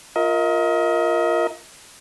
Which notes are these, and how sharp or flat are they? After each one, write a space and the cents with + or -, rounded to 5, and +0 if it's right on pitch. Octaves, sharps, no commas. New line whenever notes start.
F4 +0 A#4 +0 D#5 +35